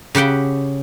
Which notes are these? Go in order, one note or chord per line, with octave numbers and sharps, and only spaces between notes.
C#3 G4 F#5 G5 B5